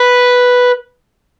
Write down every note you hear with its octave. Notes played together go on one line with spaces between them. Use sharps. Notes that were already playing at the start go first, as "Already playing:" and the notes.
Already playing: B4